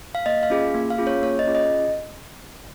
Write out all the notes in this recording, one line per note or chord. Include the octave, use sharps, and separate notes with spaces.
F5
A#3 D#5
F5
C#4 F4 G#4
A#3
F5
C#4 F4 G#4
C#5
A#3 C#5
D#5
C#4 F4 G#4
D#5